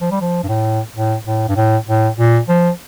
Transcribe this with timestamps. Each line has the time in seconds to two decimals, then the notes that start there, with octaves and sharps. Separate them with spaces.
0.01 F3
0.11 G3
0.21 F3
0.44 G2
0.48 A2
0.95 A2
1.25 A2
1.49 G2
1.56 A2
1.87 A2
2.18 A#2
2.49 F3